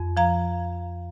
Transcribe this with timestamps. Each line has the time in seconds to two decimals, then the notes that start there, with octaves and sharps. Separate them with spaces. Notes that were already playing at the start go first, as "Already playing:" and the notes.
Already playing: F2
0.17 F3 F5 A#5